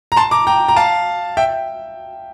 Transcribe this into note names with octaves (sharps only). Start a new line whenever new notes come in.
A#5
A5 C6
A#5 D6
G5 A#5
A#5
F5 A5
E5 G5